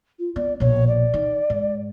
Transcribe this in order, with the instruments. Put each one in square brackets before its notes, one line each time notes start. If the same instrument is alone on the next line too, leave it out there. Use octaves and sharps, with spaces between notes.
[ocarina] F4
[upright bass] B3 [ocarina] D5
[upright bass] A#1 B2 [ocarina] C#5
[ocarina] D5
[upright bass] D#3
G#2